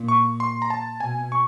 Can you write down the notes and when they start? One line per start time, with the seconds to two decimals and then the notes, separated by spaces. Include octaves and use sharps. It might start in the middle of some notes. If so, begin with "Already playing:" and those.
Already playing: A#2
0.08 C#6
0.40 C6
0.62 A#5
0.70 A5
1.00 B2 G#5
1.32 C#6